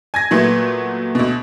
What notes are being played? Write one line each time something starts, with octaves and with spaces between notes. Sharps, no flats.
G#5 G#6 A#6
A#2 F#3 A3 B3
D2 B2